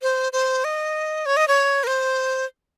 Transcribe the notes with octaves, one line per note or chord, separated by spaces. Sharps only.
C5
C5
D#5
C#5
D#5
C#5
A#4
C5